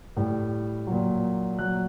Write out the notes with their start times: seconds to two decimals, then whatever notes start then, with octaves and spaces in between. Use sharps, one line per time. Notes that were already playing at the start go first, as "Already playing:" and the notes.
0.17 A2 G3
0.87 A#2 F#3
1.58 A#2 F#3 F#6